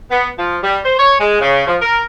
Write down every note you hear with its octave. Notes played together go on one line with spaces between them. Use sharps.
B3
F3
G3
C5
C#5
G#3
C#3
F3
A#4